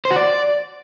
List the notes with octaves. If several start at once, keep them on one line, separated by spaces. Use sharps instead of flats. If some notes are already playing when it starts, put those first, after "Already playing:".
C5
F#4
D5